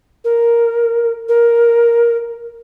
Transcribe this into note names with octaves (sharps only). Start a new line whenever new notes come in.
A#4
A#4